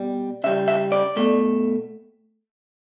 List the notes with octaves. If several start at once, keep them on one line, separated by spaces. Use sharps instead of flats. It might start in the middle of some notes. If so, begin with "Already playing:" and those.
Already playing: B2 G3
C#3 G3 E5
E5
D5
B2 A3